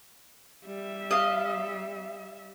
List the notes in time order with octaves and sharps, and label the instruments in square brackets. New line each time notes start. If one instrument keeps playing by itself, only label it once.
[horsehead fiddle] G3 E5
[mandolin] D#5 F5